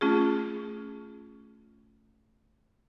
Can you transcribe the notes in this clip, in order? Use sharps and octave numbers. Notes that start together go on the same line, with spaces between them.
A3 C#4 F4 G#4